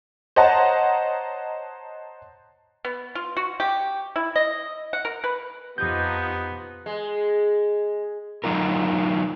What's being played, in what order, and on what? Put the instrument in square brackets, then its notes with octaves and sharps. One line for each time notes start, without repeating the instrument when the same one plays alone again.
[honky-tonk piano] C5 C#5 D#5 F#5 A5 A#5
[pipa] B3
F4
F#4
G4
E4
D#5
F#5
A#4
B4
[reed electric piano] F2 G6 [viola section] F3 D#4 [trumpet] B3 [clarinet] G4
[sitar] G#3
[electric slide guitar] F#3 D#4 F4 A#4